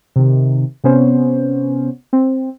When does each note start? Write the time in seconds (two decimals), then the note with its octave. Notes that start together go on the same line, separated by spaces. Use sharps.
0.16 C3 D#3
0.84 C3 B3 C#4 C5
2.13 C4